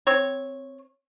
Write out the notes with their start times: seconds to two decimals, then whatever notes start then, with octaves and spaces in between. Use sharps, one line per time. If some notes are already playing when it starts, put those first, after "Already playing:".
0.07 C4 C#5